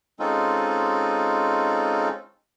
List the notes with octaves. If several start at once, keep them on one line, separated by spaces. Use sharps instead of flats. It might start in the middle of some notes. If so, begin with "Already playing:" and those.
G#3 C4 C#4 D#4 F4 A4